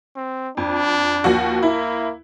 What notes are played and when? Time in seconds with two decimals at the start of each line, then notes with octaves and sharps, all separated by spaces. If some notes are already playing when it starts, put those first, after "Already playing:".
0.16 C4
0.57 F2 D4
1.24 D#2 F3 F#4
1.63 A#3 E4